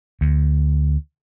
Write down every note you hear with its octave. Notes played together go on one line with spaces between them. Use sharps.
D2